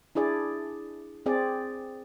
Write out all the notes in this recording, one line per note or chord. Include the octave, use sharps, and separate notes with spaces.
D4 E4 G#4 D5
C4 G#4 D5